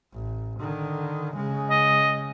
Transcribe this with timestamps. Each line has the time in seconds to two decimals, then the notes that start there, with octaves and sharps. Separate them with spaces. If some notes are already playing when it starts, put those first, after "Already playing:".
0.13 A1
0.60 D3 D#3
1.36 C#3 G#3
1.71 D#5